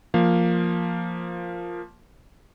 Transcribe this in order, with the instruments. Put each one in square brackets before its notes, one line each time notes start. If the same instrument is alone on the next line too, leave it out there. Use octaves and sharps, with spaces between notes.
[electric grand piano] F3 A#3 F5